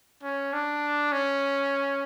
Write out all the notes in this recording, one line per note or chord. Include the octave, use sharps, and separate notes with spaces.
C#4
D4
C#4